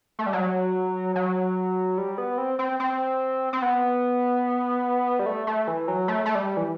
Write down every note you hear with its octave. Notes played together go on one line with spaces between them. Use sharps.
A3
G3
F#3
F#3
G3
B3
C4
C4
C4
C4
B3
G3
A3
A3
E3
F#3
A3
A3
G3
E3